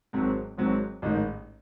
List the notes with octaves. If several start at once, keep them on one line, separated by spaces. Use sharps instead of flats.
G#1 G#2 F#3 C4
G#1 G#2 F#3 C4
A1 G#2 D#3